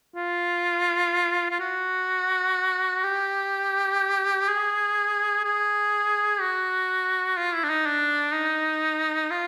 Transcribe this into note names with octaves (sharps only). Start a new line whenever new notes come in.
F4
F4
F#4
G4
G#4
G#4
F#4
F4
E4
D4
D#4
D4
D#4
F4